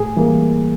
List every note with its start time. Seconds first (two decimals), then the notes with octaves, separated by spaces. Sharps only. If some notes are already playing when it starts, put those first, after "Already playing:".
Already playing: A2 G#4
0.17 E3 G3 A#3